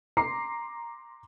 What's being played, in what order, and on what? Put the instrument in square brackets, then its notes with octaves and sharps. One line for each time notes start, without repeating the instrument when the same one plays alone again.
[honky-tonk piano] A#5 C6 D6 C7